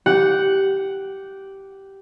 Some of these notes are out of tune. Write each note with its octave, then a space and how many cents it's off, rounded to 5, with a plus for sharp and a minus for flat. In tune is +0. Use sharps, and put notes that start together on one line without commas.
G4 -10 F#5 +0